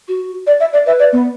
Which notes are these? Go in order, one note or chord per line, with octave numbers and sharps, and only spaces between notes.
F#4
D5
E5
D5
B4 E5
D5
B3